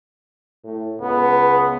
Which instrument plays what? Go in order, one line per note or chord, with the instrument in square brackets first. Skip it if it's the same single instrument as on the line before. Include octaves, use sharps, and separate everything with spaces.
[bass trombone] A2
[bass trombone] C#2 [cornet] B3